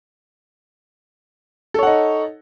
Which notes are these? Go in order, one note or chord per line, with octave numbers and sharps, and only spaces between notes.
D#4 A4 C#5 F#5